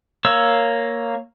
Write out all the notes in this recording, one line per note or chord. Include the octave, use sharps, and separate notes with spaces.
A#3 C#5 E6